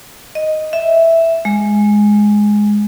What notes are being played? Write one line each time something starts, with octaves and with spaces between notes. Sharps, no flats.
D#5
E5
G#3